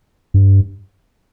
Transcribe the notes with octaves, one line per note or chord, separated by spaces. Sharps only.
G2